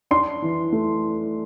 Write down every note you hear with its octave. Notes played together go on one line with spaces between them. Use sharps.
D4 C6
E3
A3